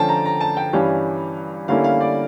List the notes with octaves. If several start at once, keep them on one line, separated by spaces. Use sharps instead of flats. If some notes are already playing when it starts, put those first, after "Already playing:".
Already playing: D3 F3 C#4 G5 A5
A#5
A#5
A5
G5
G2 E3 G3 C#4 F5
D3 G3 A#3 C#4 E4 F5
F5
D5